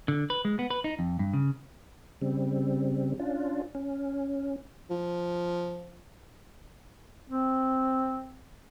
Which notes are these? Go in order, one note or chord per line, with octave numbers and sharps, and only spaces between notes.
D3
B4
G#3
B3
B4
D#4
F2
G2
C#3
C#3 G3 C4
C#4 D4 F4
C#4
F3
C4